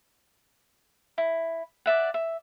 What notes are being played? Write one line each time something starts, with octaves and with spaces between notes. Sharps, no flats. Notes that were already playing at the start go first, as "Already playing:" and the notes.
E4
D5 E5 F#5
E5